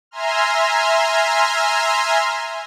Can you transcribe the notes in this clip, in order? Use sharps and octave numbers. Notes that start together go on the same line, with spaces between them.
E5 G#5 A#5 C6 F6